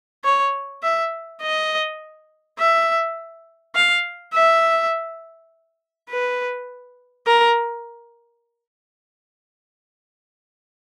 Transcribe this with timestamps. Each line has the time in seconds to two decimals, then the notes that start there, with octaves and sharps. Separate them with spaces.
0.25 C#5
0.83 E5
1.42 D#5
2.59 E5
3.75 F5
4.33 E5
6.09 B4
7.27 A#4